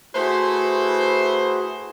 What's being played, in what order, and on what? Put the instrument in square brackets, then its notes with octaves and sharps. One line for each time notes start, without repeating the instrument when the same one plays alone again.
[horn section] A3 B4 C5 [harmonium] E4 F#4 G#4